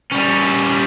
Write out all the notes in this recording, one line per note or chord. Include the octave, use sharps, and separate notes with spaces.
G3 C#4